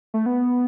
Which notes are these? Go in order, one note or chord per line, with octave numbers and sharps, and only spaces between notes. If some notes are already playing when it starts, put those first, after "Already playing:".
A3
B3